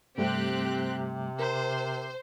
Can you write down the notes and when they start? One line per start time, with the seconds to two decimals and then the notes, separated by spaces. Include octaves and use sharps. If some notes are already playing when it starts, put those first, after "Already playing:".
0.18 G2 C3 G3 A3 C4 G4 F#6
1.39 A#4 C5